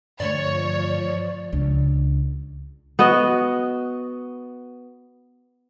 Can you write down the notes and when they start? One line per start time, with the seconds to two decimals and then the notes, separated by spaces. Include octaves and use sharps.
0.20 G2 D3 F3 A3 C#5 D5
1.53 C#2 D4
2.99 B3 F#4 D#5